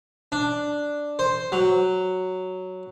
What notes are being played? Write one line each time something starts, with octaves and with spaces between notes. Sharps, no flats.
D4
C5
F#3